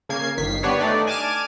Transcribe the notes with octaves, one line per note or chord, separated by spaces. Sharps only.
C#3 A#3 G#6 C7
G1 D#3 B6 C7
B3 D4 G4 B4 C#5
A3 D4 D#4 D5
G#5 A5 D6 F6 D#7